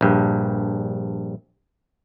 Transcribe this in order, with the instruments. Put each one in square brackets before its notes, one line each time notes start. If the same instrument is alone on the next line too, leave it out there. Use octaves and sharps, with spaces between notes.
[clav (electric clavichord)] A#1 G2